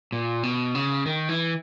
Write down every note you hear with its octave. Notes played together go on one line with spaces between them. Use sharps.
A#2
B2
C#3
D#3
E3